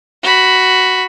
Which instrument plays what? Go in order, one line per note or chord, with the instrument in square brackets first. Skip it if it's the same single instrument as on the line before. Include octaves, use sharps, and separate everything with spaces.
[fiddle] F#4 B5